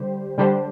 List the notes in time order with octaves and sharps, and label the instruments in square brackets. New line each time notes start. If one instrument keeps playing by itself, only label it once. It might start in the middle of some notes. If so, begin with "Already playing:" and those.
Already playing: [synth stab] D3 G3 G4 C5
D3 G3 D4 G4 C5